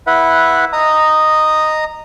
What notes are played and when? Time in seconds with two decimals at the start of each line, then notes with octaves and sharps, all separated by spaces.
0.07 E4 B4 E5 F#5
0.73 D#5 A#5 D#6